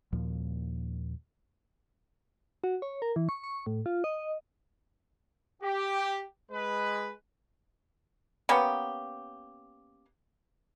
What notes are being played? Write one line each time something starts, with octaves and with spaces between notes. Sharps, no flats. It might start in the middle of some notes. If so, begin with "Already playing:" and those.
D#2 A#2 F3
F#4
C#5
A#4
E3
C#6
C#6
A2
F4
D#5
G4
G#3 B4
A#3 B3 C#4 G4